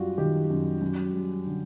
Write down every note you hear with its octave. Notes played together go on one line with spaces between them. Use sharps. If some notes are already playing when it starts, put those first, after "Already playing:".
Already playing: F#2 G3 F4 F#4
D#3 G4
F#2
F#2
G3
D3